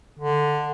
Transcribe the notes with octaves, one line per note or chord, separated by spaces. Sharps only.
D3